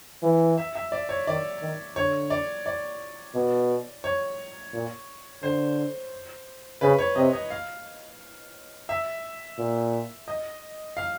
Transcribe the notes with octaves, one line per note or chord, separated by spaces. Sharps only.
E3
E5
E5
D5
C#5
D#3 D5
D#3
D3 C#5
D5
D5
B2
C#5
A#2
D3 C5
C#3 B4
C#5
C3 D#5
D#5
F5
E5
A#2
D#5
F5